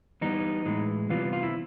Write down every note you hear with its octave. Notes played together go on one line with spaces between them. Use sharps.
E3 G3 B3 D#4
A2 E3 G#3
C3 E3 G3 B3 F4
F4
E4